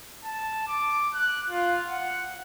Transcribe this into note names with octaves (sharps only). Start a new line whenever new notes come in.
A5
D6
F#6
F4
F#5